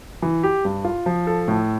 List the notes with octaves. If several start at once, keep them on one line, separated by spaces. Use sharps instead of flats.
E3
G4
G2
F4
F3
A4
A2